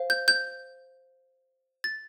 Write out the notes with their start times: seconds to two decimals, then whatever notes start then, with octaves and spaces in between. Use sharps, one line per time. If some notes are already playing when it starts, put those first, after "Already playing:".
Already playing: C5 F5
0.10 G6
0.28 G6
1.84 A6